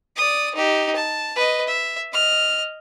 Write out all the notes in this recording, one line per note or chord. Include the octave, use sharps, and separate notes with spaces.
D5 D#6
D#4 G4
A5
B4 D#5
E5
D#5 F6